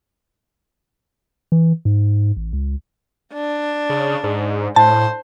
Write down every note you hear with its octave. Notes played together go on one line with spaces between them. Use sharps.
E3
G#2
A1
C#2
D4
C#3
G#2
A2 C5 A5